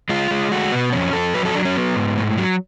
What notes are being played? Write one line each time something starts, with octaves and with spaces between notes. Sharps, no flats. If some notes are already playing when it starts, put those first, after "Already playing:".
G#3 F4
G#3
A3 F#4
B2 B3
F2 C#4
F2 A4
F#3 B4
A4
F#3 D4
C#4
B3
G#2
A2
F#3